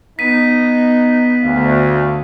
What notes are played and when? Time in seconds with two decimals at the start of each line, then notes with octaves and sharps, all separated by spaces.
0.19 B3 D#4 B6 D#7
1.43 D2 F5